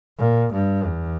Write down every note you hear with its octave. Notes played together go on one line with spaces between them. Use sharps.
A#2
G2
E2